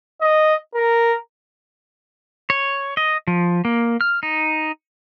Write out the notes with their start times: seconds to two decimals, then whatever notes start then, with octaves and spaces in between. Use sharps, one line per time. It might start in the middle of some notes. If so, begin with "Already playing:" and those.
0.21 D#5
0.75 A#4
2.50 C#5
2.97 D#5
3.27 F3
3.65 A#3
4.01 F6
4.23 D#4